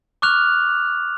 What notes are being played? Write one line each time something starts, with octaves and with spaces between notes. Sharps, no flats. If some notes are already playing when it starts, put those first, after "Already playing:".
C#6 D6 F6 F#6 F7